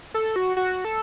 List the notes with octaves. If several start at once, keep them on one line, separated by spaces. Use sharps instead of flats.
A4
F#4
F#4
A4